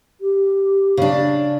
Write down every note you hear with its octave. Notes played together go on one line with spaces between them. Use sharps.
G4
C#3 D4